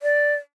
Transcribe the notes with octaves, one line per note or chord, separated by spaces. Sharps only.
D5